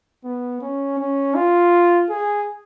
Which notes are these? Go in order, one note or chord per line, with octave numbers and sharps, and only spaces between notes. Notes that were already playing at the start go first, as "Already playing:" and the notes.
B3
C#4
C#4
F4
G#4